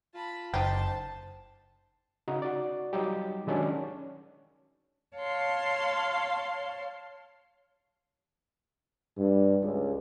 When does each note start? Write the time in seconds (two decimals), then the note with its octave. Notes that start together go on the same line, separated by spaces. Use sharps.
0.14 F4 A5 B5
0.54 F#1 D#4 G4 C5 A5
2.28 C#3 D#4 F#4
2.42 F#4 D5
2.93 F#3 G3 D#4 G4
3.47 D#3 F#3 G#3 C#4 D4
5.16 C#5 F5 A5 C6
9.18 G2
9.64 C#2